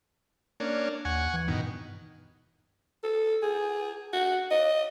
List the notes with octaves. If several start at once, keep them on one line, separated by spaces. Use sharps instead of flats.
A#3 C#4 D4
D#2 F#5 G#5 C#6
E3
G2 B2 D#3
A4
G#4
F#4
D#5